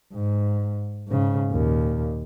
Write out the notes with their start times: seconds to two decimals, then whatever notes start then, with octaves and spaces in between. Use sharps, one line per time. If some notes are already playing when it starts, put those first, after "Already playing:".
0.13 G#2
1.08 G#2 C#3
1.51 D#2 A#2